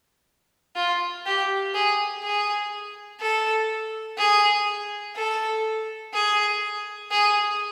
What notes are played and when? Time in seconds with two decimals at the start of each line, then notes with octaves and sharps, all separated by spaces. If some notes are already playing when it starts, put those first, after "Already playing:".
0.76 F4
1.25 G4
1.74 G#4
2.23 G#4
3.20 A4
4.18 G#4
5.16 A4
6.14 G#4
7.11 G#4